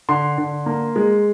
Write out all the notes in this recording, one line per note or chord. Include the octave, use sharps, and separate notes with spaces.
D3 C6
D3
A#3
G#3